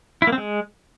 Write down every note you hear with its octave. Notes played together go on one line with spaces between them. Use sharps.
E4
A#3
C4
G#3